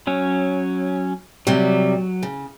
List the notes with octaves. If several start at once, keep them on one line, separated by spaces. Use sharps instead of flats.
F#3 C#4
C3 F#3 G3
C#3